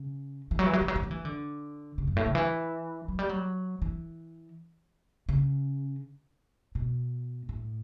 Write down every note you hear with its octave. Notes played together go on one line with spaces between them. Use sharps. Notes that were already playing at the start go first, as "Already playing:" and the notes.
Already playing: C#3
E3
F#3
E3
F#3
E3
F#3
E3
F#3
E3
D3
C#3
F#2
A2
C#3
E3
F#3
G3
F#3
E3
C#3
B2
A2